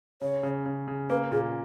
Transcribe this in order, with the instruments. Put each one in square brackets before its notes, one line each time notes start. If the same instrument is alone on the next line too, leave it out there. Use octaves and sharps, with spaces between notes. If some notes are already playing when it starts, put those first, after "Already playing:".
[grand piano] C#3 [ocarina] C#5
[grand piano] C#3
C#3
C#3
[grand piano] A#3 [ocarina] B4
[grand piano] A#2 [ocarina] G#4